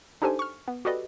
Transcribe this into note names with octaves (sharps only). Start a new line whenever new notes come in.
D4 D#4 G4 A4 C5 G#5
C#6 F6
B3
F#4 G4 A4 B4 D5 D#5